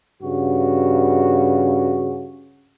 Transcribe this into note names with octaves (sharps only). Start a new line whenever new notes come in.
G2 C#3 F#4